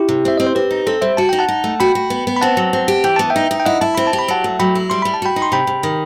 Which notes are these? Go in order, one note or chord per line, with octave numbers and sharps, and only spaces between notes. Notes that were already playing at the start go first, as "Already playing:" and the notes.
Already playing: E4 G4
C3
C4 E5
C4 D#5
C5
C4 G4 B4
D#4
C4 A4 C5
G3 C5 E5
F#4 A5
D#4 G5
F#5 A5
D#4
A3
F#4 G5 B5
F#4
B3
B3
B5
C4 F#5 A5
F#3
C4
G4
E3 G5
B3 A5
E5 G5
D#4
D#4
G5
E4 D#5 F#5
E4 A5
C4 B5
A5
G4
B5
F#3 F#5 A5
A3
F#3 G5 B5
E4
G3 C6
G3 B5
A5
F#4 G5 B5
D#4
C6
C3 G5 B5
C3
D#3